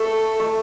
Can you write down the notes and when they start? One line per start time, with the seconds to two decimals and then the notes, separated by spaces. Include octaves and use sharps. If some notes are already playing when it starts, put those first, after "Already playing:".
Already playing: A3 A4
0.40 A3